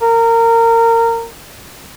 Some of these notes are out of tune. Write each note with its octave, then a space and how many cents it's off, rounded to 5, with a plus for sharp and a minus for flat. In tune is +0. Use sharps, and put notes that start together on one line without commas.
A#4 -20